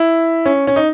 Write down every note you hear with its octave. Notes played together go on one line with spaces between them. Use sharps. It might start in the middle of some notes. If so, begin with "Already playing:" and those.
Already playing: E4
C#4
C#4
D#4